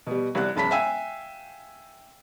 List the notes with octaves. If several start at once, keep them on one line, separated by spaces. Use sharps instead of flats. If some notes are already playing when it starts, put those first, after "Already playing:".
B2 G3
C2 C3 D5 F#6
E1 F#2 A5 B5 B6
E5 F5 G5 G#5 E6